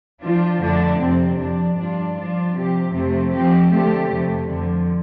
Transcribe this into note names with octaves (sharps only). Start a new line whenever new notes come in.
F3 D4 F4
F2 D3 A3 D4
F2 C3 F3 C4
F2 F3 D4
G2 F3 D4 F4
F3 D4 F4
C3 F3 C4 G4
F2 C3 A3 C4
F3 C4 G4
D3 A3 C4 G4
F2 C3 A3
F2 D3 F3